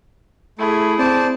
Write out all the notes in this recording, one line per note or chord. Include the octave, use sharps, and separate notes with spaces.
A3 E4 G#4
C4 C5 D5 A5